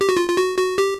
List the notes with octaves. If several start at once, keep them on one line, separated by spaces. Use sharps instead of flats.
G4
F#4
F4
F4
F#4
F#4
G4